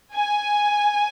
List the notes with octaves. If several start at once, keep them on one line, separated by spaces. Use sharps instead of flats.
G#5